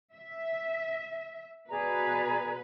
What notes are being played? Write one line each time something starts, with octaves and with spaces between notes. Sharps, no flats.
E5
B2 G#4 B4 D5 A#5